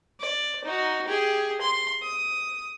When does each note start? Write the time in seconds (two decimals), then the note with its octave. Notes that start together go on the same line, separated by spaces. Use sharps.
0.20 D5
0.65 D#4 F#4
1.07 G4 G#4
1.62 C6
2.02 D#6